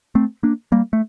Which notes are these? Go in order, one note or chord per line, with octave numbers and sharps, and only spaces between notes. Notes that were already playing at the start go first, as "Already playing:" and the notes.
A3 C4
A#3 D4
G3 A#3
A3